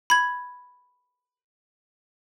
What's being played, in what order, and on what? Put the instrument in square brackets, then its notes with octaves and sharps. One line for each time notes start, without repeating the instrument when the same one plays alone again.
[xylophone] B5 G#6